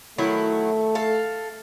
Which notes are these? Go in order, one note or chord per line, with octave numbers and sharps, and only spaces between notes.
D#3 F#3 A3 E4
A4 F5